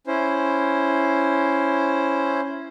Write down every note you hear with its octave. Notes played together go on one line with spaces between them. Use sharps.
C#4 E4 C5